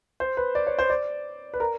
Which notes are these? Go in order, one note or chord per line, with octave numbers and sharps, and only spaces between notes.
C5
B4
D5
C#5
C5
D5
B4
A#4